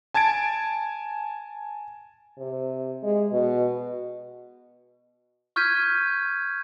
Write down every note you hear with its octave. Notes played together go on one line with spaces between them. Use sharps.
G#5 A5 G#6 A6 D7
C3
G#3
B2
C#6 F6 G6 G#6 B6 D#7